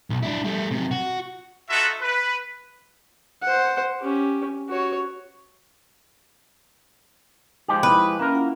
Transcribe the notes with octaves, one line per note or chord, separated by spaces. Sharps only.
B1
D4 E4
G3 A3
C3 F#3
F#4
D#4 F4 F#4 A4 E5 F#5
B4
C5 F#5
C#4 G4
F#4 C#5
F3 G#3 D#4 G4 G#5 D6
E4 B4 C6 D#6
A#3 C#4 A#4 E5 G5
E4 F4 F#5